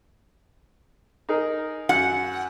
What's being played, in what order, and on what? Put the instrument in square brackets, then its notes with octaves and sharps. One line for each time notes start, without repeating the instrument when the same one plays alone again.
[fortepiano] D#4 G#4 A#4
[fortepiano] F#2 [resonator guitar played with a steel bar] F#5